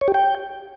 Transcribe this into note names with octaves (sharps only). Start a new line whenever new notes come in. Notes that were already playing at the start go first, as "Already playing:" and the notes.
C#5
G4
G5